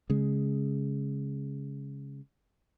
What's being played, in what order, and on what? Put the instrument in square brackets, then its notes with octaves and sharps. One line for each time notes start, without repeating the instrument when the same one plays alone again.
[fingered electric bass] C#3 G#3